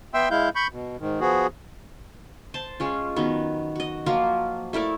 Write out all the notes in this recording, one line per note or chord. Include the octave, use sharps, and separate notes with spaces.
B3 E5 G5 C6 E6
G#3 E4 F5 G6
B5 C#6 G6
B2
G#2 D#3
F3 B3 F#4 G#4
C5 A5
G#3 C#4 F4
D#3 F#3 B3
F#4 D#5
F3 F#3 A#3 F4
A3 E4 A#4 D5